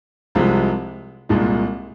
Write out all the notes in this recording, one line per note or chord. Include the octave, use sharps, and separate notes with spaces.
C2 C3 F3 G#3
C2 A#2 G#3